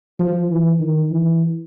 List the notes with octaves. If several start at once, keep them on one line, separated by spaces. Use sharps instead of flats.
F3
E3
D#3
E3